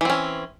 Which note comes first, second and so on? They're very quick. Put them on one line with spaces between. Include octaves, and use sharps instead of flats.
E3 C4 C#4